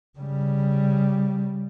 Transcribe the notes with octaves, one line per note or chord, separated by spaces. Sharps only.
C#3 G3